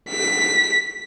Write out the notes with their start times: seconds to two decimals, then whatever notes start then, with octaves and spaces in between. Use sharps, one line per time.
0.10 B6